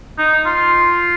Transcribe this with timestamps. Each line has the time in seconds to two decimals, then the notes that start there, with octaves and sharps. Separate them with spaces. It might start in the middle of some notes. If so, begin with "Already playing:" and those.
0.18 D#4
0.46 F4